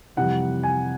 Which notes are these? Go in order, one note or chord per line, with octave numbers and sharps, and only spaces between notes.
F2 C3 E3 G3 F#5
G#5